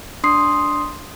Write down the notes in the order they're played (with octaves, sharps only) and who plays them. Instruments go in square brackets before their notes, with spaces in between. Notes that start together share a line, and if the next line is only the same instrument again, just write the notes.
[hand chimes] D4 C6 D#6 C7